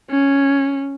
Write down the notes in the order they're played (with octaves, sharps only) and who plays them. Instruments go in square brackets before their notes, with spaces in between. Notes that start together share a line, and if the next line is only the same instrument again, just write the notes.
[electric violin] C#4